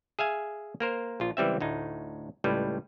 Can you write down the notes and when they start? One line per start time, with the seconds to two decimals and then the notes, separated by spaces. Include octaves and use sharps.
0.19 G#4 E5 F5 G#5
0.80 A#3 A#4 C5
1.20 A#1 F4
1.37 C#2 E3 G3 C4 E5
1.60 D2 A2 D#4
2.44 C#2 A2 G3 B4